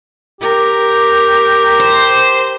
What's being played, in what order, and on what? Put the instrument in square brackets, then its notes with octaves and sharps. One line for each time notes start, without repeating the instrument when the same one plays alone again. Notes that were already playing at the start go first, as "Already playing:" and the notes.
[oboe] G4 [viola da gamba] A#4
[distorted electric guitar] C5